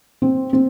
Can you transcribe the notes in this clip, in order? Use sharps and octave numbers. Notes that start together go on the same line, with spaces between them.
C4
C4